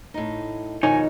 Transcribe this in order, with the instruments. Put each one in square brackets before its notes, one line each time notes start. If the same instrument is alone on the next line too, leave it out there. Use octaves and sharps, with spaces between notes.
[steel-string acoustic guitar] A2 D#4
[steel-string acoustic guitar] F2 B2 D#3 [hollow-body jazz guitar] D#4 C#5 [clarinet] G#5